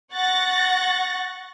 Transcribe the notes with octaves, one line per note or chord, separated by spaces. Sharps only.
F#5 C#6 F#6 A6 A#6